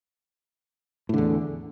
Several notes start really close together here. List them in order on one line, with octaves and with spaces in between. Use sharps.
A2 D3 E2